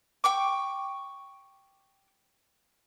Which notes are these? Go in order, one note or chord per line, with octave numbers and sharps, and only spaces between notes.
G5 C#6 D6